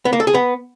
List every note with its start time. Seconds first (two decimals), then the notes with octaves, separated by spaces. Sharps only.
0.05 B3
0.13 A#3
0.20 A4
0.27 G#4
0.34 B3